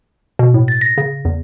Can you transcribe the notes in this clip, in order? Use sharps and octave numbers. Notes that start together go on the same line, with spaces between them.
B2
A2
A6
A#6
C#3
E2